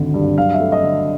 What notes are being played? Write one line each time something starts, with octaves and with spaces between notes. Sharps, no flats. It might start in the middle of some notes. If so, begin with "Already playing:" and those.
Already playing: G#1 D2 D3
G2
F#3 F5
E5
A3
D#5
D3